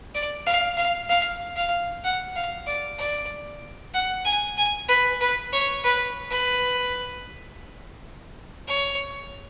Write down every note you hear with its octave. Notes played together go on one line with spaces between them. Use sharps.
D5
F5
F5
F5
F5
F#5
F5
D5
D5
F#5
G#5
G#5
B4
B4
C#5
B4
B4
C#5